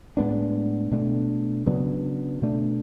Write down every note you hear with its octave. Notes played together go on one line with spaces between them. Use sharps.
A2 G#3 B3 D4
B2 A3 D4
C#3 F#3 B3 D4
B2 A3 D4